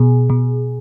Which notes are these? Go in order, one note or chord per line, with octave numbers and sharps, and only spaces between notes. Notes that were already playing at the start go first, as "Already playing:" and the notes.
Already playing: B2 G#4
B2